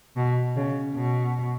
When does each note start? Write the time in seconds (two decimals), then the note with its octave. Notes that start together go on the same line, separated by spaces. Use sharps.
0.17 B2
0.56 C#3
0.96 B2